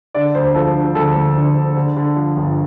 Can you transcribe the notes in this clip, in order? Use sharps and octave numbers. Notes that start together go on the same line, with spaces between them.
D3 D5
D2 C5
F3 A4
D3
D2 A4
D2
D3
D3
D3
D3
F3
G1